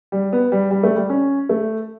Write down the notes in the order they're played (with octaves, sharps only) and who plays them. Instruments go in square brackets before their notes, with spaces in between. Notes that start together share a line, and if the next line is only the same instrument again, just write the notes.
[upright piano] G3
B3
G3
G3
A3
G3
C#4
A3